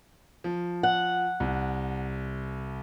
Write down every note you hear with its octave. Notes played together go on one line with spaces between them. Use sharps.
F3
F#5
C2